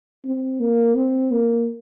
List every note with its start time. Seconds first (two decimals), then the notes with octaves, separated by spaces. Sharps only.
0.25 C4
0.60 A#3
0.95 C4
1.31 A#3